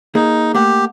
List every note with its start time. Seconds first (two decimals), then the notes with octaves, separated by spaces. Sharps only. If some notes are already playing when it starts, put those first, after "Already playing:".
0.15 A#3 D#4 G#4
0.54 A3 A#3 G4 F#5